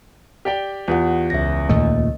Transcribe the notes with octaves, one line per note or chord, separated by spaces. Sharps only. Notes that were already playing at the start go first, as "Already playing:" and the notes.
G4 D5 G5
E2 F4 G4 F#5
C#2 E5 A#6
D#2 A#2 A3 D#5